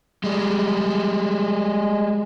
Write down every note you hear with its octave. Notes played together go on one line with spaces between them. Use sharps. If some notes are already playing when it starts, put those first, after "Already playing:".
G3 G#3